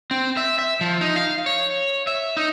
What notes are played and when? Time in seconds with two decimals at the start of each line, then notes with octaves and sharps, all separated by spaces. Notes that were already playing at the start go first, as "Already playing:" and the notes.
0.11 C4
0.37 E5
0.59 E5
0.81 F3
1.01 D#4
1.16 F5
1.46 C#5
2.07 E5
2.37 D#4